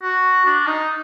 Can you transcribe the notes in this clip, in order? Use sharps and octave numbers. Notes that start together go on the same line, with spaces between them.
F#4
D4
D#4